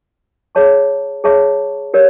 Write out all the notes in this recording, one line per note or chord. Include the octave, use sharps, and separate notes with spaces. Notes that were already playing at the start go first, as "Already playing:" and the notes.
G#4 C#5 E5 A5 C#6
G#4 C#5 E5 A5 C#6
G4 A#4 C#5